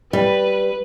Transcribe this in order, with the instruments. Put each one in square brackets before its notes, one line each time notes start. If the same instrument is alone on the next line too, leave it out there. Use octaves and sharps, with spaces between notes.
[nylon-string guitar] G3 [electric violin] B4